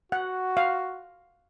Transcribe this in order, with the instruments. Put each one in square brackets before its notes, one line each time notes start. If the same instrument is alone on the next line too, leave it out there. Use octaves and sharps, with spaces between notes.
[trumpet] F#4 [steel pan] F#5
[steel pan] F5